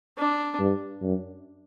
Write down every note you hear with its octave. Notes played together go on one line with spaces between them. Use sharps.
D4
G2
F#2